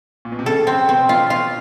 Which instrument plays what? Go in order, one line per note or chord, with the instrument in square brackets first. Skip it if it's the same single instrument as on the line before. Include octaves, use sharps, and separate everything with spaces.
[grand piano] A#2
B2
C3
[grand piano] C#3 [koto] A4
[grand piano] C#3 [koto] C4
[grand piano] B2 [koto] C4
[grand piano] B2 [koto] F4
[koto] F4